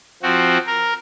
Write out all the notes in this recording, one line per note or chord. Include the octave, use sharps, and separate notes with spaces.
F3 C4 F#4
A#4